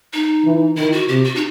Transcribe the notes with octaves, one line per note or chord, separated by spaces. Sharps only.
D#4
E3
D#3 E4
F#4
C3 G4
F#4
D#4